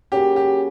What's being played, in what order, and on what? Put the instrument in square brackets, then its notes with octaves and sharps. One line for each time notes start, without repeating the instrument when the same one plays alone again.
[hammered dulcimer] C#3 F#3 A#3 [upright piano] G4
[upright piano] G4